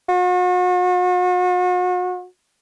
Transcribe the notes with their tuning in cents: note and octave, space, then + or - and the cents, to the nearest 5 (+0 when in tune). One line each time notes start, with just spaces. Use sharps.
F#4 -40